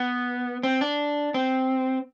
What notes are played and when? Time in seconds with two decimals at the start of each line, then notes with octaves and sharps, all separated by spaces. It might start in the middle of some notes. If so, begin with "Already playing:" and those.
Already playing: B3
0.63 C4
0.81 D4
1.34 C4